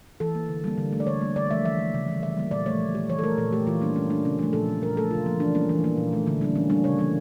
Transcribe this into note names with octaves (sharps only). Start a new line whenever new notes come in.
E3 A4
A#3
D3
G3 A#3
D3
A3
D5
D3 C#5
G3 A#3
D3 D5
F3 A3 E5
E3 E5
A3
C#3
E3 G3
E3 E5
G3 A#3
A#2 D5
F3 A3 C#5
E3
A3 G4
E3 C#5
A4
A3 A#4
A#2 A4
A3 G4
E3 F4
G3 A#3 D4
E3 C#4
A#3 D4
C#3 C#4
F3 A3 D4
A#2 A4
A3
A#2 A#4
F3 A3 A4
C#3 F4
F3 A#3
E3 D4
G3 A#3 C#4
E3
A#3
A#2
A3
D3 E4
G3 A#3 D4
E3 C#4
G3 A#3 D4
C#3 C#5
E3 G3 A#3